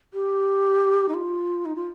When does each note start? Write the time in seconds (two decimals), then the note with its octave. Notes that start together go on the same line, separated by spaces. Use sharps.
0.14 G4
1.09 D#4
1.14 F4
1.65 D#4
1.76 F4